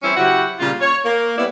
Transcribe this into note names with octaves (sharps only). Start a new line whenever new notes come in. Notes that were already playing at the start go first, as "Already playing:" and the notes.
E3 G3 C4 C#4 E4
C#3 F#3 E4 F#4 G4 F#5
A#2 C#3 G3 F4
C#5
A#3
G3 B3 C#4 E4 B4 D5